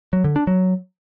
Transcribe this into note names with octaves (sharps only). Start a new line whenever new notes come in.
F#3
D3
D4
F#3